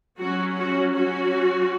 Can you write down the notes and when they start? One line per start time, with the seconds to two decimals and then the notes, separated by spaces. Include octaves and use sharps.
0.20 F#3 C#4 F#4
0.58 F#4
0.96 F#3 C#4 F#4